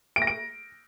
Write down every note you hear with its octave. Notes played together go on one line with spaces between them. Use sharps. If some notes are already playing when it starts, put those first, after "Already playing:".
D7
A#6
D7